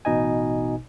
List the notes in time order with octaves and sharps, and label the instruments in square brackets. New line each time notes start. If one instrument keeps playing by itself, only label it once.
[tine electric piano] A1 B2 D#4 D#5 G#5